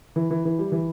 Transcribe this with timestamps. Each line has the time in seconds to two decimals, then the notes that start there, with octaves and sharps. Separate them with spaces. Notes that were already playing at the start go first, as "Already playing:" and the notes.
0.16 E3
0.31 E3
0.45 E3
0.59 G3
0.72 E3